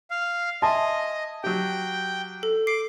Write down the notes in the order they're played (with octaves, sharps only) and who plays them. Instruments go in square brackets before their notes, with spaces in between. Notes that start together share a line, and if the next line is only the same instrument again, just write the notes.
[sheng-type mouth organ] F5
[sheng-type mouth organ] D#5 [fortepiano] E5 G#5 C6 [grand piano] A5
[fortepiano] F#3 G4 [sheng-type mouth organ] G5
[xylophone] A4
[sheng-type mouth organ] D6 [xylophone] C7